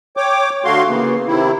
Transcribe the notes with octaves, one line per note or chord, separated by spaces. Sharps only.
C#5 G5 D6
D3 A3 F#4 F5 C6
C#3 E3 A#3 B3
C3 D#3 E4